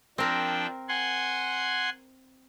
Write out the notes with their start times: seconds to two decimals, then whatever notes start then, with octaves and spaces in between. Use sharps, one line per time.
0.18 F3 C4 D4 A#4 G5
0.89 F#5 G#5 C6